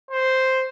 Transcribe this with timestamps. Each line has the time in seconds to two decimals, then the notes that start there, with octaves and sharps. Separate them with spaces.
0.11 C5